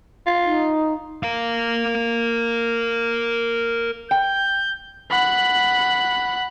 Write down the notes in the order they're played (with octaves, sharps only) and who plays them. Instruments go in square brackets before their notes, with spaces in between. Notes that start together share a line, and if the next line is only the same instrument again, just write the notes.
[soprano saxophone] F4
[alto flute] D#4
[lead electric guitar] A#4 F5
[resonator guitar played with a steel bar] G5 [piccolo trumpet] G6
[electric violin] F#5 B5